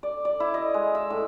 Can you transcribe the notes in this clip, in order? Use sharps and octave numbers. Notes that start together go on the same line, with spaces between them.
D5
D5
E4
D#5
G#3
E5
A2